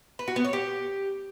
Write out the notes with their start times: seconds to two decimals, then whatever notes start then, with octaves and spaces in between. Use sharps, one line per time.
0.19 B4
0.28 F#4
0.36 B3
0.45 C#5
0.53 G4